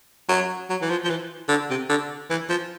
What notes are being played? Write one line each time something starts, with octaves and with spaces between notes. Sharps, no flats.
F#3
F#3
E3
F3
F3
E3
D3
C3
D3
E3
F3